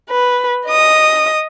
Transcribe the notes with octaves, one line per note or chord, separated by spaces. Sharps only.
B4
D#5 D#6